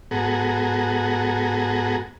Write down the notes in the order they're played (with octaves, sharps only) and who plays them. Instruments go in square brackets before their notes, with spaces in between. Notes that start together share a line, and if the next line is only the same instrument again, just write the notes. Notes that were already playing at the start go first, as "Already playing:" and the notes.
[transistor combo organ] G#2 B3 F#4 G#4 A4 A#5